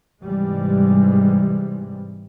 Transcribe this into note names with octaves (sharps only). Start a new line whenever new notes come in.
G#2 C3 E3 G3 G#3